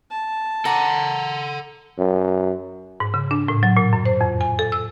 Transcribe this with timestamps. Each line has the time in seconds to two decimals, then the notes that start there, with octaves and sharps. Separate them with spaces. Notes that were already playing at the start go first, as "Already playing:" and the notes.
0.11 A5
0.65 A4 F#5 A#5
1.99 F#2
3.00 G#2
3.14 C#3
3.31 D4
3.48 A2
3.63 F#3
3.77 A#2
3.93 F#2
4.06 C5
4.21 F2
4.41 G#5
4.59 A4
4.72 E6